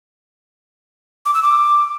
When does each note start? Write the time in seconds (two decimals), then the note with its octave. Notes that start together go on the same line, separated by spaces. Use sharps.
1.26 D6
1.34 E6
1.43 D6